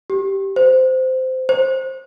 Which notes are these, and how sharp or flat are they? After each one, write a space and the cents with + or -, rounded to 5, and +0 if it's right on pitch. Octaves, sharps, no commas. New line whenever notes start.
G4 -10
C5 -15
C5 +10